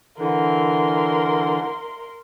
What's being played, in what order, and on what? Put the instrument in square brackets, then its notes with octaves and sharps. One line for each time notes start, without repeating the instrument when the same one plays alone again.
[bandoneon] D3 E3 [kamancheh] A#4 C6